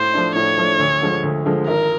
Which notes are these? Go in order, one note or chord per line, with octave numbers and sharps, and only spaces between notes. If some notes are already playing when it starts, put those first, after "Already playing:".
Already playing: A2 C5
F3 A3 D4
A2 C#5
F3 A3 D4
D2
D3 F3 G#3
D2
D3 F3 G#3
G#1 A#4